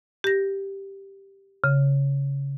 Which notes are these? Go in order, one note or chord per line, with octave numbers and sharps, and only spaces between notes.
G4 A#6
C#3